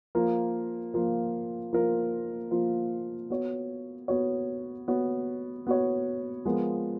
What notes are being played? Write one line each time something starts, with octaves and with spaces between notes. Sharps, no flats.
F3 A#3 F4 A#4
F3 A#3 F4 A#4
F3 A#3 F4 A#4
F3 A#3 F4 A#4
B3 F#4 C#5
B3 F#4 C#5
B3 F#4 C#5
B3 F#4 C#5
F3 G#3 B3 F4 A#4